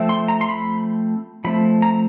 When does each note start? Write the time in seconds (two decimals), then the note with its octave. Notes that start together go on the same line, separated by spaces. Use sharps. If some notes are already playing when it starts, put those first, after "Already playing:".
Already playing: F3 A3 C4
0.09 C6
0.28 A#5
0.41 C6
0.49 B5
1.44 F3 A3 C4 B5
1.82 A#5